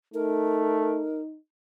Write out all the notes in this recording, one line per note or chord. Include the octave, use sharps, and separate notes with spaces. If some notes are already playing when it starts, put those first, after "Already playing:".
A3 D#4 A#4